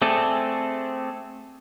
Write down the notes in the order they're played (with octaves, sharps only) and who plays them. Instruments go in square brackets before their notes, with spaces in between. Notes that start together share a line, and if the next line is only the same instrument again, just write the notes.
[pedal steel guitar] A3 C4 G#4 A4 D5